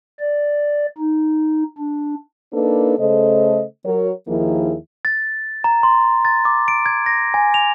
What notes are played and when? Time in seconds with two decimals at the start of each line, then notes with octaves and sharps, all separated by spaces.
0.20 D5
0.98 D#4
1.78 D4
2.53 A#3 D4 D#4 A4 B4
2.99 C#3 A3 A4 C5 D#5
3.85 F#3 A#4 C#5
4.28 D#2 D#3 F3 A#3 E4 G#4
5.05 A6
5.64 A#5
5.83 C6
6.25 A6
6.45 D6
6.68 D7
6.86 G#6
7.06 A#6
7.34 G#5
7.54 F7